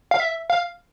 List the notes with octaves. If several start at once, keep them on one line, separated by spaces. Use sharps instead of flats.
F5
E5
F5